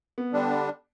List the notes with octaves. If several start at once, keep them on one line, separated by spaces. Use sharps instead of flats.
B3
D3 G3 D4